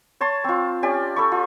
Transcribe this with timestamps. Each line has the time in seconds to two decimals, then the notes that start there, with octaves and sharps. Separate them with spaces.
0.21 C#5 A5 C6
0.44 C4 F4
0.83 C#4 G4 D5
1.16 A4 B5 C#6
1.32 F4